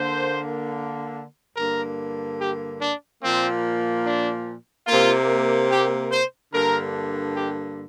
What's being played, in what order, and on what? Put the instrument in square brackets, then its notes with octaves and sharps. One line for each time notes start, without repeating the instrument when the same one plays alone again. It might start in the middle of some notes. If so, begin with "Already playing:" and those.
Already playing: [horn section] D3 A#3 C5
G2 D3 A#3 A#4
G4
D4
A#2 F3 A#3 C4
D4
C3 A#3 F4
G4
C5
G2 D3 A#3 A#4
G4